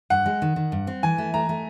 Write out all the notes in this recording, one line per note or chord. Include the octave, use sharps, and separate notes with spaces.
G2 F#5
G#3
D#3
D#3
G2
C4
E3 G#5
A3
A3 A#5
A3